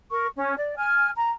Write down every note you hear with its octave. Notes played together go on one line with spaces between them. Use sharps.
A#4 C#6
C#4
D5
G#5 F6
A#5